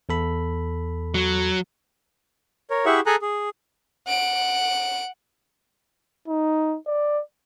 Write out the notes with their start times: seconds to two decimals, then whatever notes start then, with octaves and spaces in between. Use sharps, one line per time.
0.09 E2 A4 B5
1.14 F#3
2.70 A#4 C#5
2.86 E4 G4 G#4 E5 F#5 C#6
3.06 G#4 A4 G#5 A#5 F#6
3.22 G#4
4.07 F#5 D7
6.28 D#4
6.87 D5